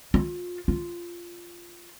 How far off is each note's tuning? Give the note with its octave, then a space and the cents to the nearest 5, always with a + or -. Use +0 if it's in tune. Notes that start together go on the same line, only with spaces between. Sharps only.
F4 +30
F4 -10